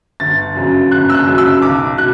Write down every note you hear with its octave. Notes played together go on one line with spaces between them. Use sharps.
G1 A6
F#2 C#3 F#3
G1 F#6
E6
F#6
F#2 C#3 F#3
E6
B1 D6
B2 F#6